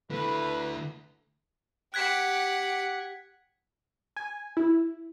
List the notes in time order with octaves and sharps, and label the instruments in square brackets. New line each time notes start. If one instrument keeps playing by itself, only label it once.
[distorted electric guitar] D3 A3 [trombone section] E4 A4 [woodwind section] B4
[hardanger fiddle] G4 F#5 [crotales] F#6 G#6 B6
[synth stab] G#5
E4